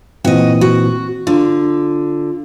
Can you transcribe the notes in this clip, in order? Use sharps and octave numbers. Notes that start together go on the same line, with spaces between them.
A#2 E3 C4 F#4 D#5
F#4
D3 F4